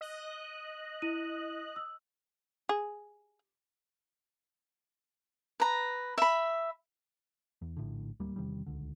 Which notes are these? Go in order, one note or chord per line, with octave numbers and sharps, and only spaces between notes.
D#5 F#6
E4 D#7
E6
G#4
B4 A#5
E5 B5
E2
A#1 A2 D3
D1 D#2 G3 A#3
E2 C3 D#3 G3
D#1 C#2 D3